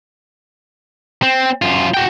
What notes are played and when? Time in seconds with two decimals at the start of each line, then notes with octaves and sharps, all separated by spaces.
1.23 C4
1.62 F#2 F4
1.94 F#4 G5